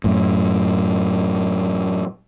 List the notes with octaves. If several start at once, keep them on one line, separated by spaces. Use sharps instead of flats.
F#2 A2